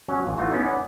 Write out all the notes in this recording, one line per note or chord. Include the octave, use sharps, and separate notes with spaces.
F#3 C#4 C#5
A1 F4
E3 A3 D#4 F4 F#4
B3 C#4 D#4 E4
C#4 B4 D5 D#5 F#5